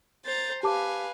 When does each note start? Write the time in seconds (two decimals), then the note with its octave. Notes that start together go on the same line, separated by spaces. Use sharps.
0.26 C5 A#5 A6
0.63 G4 B4 F5 G#5 A5 D6